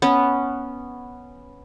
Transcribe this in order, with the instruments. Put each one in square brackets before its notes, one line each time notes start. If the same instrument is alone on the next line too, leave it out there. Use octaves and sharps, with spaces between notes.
[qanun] B3 C#4